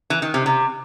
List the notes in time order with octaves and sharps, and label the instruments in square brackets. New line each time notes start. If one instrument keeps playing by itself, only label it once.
[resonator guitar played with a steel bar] E3
D#3
C3
C3